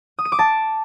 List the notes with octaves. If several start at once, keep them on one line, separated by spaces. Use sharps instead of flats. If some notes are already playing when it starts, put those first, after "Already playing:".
D#6
D#7
D6
A5